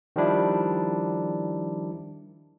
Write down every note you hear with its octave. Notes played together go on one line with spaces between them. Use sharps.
D#3 F3 G3 D4 E4